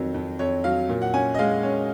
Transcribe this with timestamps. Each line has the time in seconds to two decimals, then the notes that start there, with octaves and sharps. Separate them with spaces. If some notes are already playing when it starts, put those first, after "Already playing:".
Already playing: F2 D#3 F#3
0.14 F2
0.39 F2 C#5
0.64 F#3 F5
0.89 A#2
1.02 F#5
1.14 C#4 G#5
1.35 D#5
1.39 G#3 F5
1.63 C#4